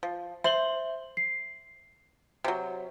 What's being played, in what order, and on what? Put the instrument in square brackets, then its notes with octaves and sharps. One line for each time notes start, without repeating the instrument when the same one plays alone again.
[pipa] F3
[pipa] C5 [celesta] E5 F#7 G7
[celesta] C7
[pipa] C3 F#3